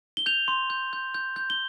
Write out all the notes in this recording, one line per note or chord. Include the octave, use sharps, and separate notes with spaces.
G7
G6 F7
C6
G6
G6
G6
G6
G7